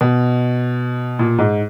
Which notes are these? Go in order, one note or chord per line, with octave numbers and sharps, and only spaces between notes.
B2
A#2
G#2